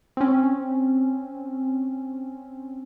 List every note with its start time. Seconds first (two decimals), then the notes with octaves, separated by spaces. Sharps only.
0.17 C4 C#4